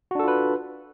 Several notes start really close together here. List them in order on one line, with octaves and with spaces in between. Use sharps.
F#4 D4 A4 F4 B4